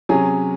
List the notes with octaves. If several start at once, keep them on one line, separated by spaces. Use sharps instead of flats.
C3 F#3 C#4 G#4